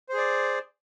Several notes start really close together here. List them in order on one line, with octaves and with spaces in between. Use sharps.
C5 G#4 D5